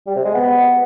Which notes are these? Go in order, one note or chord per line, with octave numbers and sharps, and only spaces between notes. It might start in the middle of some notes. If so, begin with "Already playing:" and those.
G3
C3
G#3
B3